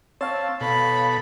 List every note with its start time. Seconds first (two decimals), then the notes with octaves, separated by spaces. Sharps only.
0.21 C4 C#5 F5 A5 E6
0.61 B2 A4 B5